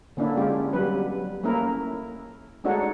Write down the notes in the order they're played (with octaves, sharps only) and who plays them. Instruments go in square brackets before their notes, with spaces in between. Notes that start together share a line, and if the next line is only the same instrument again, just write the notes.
[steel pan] D3 A#3 C#4 D4 E4
G#3 C#4 F4 G4
F#3 G3 B3 C#4 B4
A3 A#3 C#4 E4 A#4
G#3 A3 D4 D#4 F#4 C#5